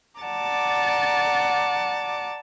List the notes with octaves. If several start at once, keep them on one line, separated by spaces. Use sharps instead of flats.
D5 F#5 A5 A#5 D6